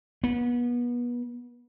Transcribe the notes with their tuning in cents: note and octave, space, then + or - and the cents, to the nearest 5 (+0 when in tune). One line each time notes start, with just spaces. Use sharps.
B3 -30